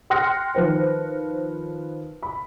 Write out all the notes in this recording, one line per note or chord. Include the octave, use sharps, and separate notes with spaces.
G5 C6 F6 F#6 A#6 C#7
D#3 F3 B4 C5
B5